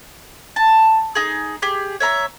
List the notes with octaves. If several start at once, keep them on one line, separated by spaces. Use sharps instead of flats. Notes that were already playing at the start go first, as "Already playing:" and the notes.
A5
D#4 G#4
G4 G#4
C#5 E5 A#5